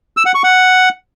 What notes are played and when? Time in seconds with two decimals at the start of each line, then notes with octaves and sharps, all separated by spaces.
0.17 E6
0.26 F#5
0.35 C#6
0.44 F#5